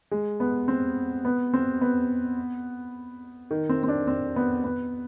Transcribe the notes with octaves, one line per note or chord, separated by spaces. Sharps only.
G#3
B3
C4
B3
C4
B3
D#3
C4
C4
D4
C4
B3
B3